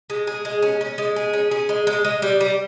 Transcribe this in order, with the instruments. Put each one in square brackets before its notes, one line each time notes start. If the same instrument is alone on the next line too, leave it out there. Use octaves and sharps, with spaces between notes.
[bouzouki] G#3
G#4
G#3
C#4
C#4
G#3
G#4
C#4
G#4
G#3
G#3
G#3
G3
G3